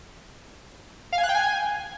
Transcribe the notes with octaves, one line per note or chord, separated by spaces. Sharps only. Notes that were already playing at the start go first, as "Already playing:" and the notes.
F5
G#5
F#6
G5
G#5